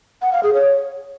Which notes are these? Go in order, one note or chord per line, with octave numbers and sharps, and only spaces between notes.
F#5
F5
G#4
C#5